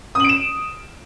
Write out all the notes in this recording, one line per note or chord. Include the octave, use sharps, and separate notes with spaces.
D#6 D7 E7 F#7